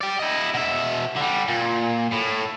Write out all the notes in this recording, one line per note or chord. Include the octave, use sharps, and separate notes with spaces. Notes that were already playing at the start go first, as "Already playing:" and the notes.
D5 G5
E4 D#5
B2 E5
D3 G3
A#2
A2